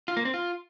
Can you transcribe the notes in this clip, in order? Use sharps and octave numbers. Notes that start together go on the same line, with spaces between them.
F4
A#3
C4
F4